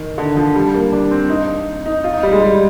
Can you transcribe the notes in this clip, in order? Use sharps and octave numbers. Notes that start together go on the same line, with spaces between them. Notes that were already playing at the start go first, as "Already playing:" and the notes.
Already playing: D#3
D3
F3
G3
A#3
D4
C4
D#4
D#4
F4
D#4
G3
G#3
G3